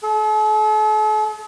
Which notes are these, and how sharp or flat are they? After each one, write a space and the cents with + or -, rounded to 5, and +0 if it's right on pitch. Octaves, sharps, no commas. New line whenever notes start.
A4 -45